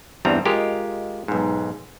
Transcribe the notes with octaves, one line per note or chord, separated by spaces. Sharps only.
E2 G2 G3 C4 A#5
G#3 F4 G4 A#4 D#5 F5
B1 G#2